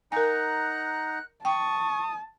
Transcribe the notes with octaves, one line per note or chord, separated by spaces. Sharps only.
D#4 A#4 F#5 G#5 A#5 F#6
G5 A5 C#6 D#6